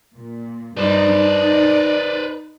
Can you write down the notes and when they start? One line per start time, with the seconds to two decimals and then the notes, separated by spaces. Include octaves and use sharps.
0.16 A#2
0.77 G2 D#4 B4 C5 D5
1.16 D#4